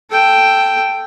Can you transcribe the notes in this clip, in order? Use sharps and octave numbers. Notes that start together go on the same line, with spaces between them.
A4 G5